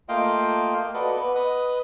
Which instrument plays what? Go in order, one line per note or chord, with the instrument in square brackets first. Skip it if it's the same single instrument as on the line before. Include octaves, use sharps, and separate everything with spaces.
[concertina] A3 A#3 F4 D#5 F5 G5
F#4 A4 B4 D5 D#5 F#5
B3 B4
B4 D#5 D#6 F#6